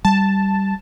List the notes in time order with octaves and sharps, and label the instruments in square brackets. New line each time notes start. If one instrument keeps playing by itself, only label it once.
[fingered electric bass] G3 [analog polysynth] A5